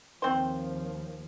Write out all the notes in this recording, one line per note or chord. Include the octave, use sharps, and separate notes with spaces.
D#2 F3 C4 C5